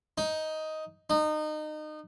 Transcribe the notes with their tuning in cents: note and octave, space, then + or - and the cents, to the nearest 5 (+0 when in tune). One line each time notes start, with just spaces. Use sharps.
D#4 +10
D#4 -25